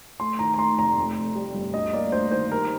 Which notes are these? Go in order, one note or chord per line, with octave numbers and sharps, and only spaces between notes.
A3 C6
D#3 A#5
A#5
A3 C6
F1 A#5
F2
F2
G3
G1
D2 D#5
A#3 D5
D2 C5
D#3 C5
G3 A#4